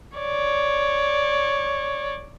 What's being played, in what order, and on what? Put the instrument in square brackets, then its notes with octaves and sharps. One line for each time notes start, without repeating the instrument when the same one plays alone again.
[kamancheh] C#5 D5